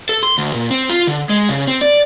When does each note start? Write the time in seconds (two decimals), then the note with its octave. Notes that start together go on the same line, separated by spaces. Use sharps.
0.09 A4
0.23 C6
0.38 D2
0.54 A#2
0.71 C4
0.90 F4
1.07 D3
1.29 G#3
1.49 C#3
1.67 C4
1.81 D5